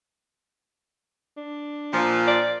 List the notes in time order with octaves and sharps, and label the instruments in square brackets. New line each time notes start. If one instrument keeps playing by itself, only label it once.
[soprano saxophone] D4
[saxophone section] A#2 F3
[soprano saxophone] D5